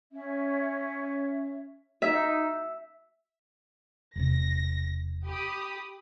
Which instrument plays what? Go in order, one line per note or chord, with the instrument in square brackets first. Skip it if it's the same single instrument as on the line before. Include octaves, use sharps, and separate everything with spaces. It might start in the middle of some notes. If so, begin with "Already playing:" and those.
[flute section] C#4 E5
[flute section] D#4 [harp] E5
[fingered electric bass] E1 C3 [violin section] A#6
[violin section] G4 B5 D#6